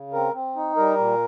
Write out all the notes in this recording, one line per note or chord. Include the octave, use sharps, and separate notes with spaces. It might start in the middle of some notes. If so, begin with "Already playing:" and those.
Already playing: C#3
C4 A#4
C4
D#4
G3 A#4
A#2